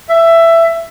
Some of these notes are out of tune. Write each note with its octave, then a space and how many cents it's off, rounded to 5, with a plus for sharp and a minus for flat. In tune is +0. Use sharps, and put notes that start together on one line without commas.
E5 +15